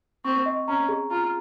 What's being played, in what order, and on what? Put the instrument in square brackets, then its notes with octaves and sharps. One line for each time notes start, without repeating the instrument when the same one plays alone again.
[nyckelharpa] C4 [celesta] C#6
[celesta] D#5
[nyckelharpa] C#4 [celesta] A#5
[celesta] G#4
[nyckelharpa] F4 [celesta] A#5